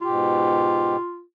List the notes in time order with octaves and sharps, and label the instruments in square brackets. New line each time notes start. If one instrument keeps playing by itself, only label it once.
[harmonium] G#2 B2 G4 [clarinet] F4